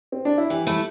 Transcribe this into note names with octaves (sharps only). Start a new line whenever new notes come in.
C4
D4
E4
E3 G4
A3 E4